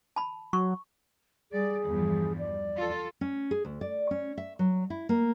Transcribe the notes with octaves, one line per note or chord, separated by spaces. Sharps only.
A5 B5
F#3 C#6
G3 G#4 D5
E2 G2 F3
D5
F4 A4
C#4
G#4
D2
D5
C#4
E5
F#3
E4
A#3